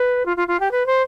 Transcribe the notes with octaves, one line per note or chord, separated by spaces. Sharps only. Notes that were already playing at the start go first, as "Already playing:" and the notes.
Already playing: B4
F4
F4
F4
G4
B4
C5